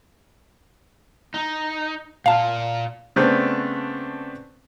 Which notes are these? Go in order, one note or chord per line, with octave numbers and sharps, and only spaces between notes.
D#4
A#2 F4 F5 A5
C#3 A3 B3 C4 D4